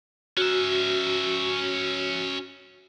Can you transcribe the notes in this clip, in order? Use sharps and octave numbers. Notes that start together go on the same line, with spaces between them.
C#4 F#4 E5